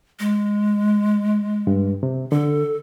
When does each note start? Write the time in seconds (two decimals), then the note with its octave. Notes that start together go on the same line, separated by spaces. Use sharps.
0.20 G#3
1.67 G2
2.03 C3
2.32 D3 A4